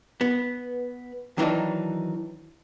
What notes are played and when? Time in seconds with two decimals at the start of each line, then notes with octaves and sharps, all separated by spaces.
0.21 B3
1.38 D#3 E3 F#3 D4 D#4